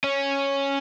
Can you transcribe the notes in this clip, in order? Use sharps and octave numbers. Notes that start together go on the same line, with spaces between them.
C#4